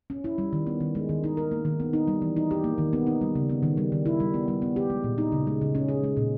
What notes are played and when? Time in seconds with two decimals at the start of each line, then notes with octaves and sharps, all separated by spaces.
0.10 C#4
0.24 E4
0.38 G3
0.53 D#3
0.67 B3
0.80 D#3
0.95 G#3
1.09 D#3
1.24 D#4
1.37 A#4
1.51 A#3
1.65 D#3
1.80 B3
1.93 D#4
2.08 G3
2.22 E3
2.37 D#4
2.51 G4
2.64 A#3
2.78 D#3
2.93 B3
3.07 D#4
3.21 G3
3.35 C#3
3.50 B3
3.63 D#3
3.77 G3
3.92 D#3
4.06 E4
4.20 G3
4.34 B3
4.48 G3
4.62 B3
4.76 G4
4.90 G#3
5.04 A#2
5.18 D#4
5.32 C#3
5.47 G#3
5.61 C#3
5.75 C#4
5.89 G#4
6.04 G#3
6.17 A#2